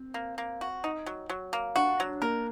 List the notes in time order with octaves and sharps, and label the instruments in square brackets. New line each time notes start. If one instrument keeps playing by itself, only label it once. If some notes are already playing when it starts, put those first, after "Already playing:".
Already playing: [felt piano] C4
[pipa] A#3
A#3
F#4
D#4
F#3
F#3
A#3
[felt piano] D4 [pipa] F#4
[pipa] F#3
[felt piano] A#3 [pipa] A#4